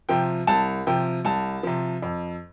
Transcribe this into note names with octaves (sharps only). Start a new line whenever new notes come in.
C3 F3 G5
C2 A5
C3 F3 G5
C2 A5
C3 F3
F2